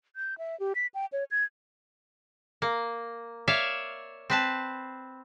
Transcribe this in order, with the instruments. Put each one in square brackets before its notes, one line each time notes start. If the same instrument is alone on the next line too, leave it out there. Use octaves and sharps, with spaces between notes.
[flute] G6
E5
G4
B6
G5
C#5
G#6
[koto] A#3
C#5 D5 E5 F5
C4 B4 A5